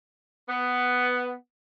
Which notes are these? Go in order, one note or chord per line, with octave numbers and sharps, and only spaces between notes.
B3